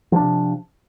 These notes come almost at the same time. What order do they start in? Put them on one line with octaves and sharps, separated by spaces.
F3 D4 C3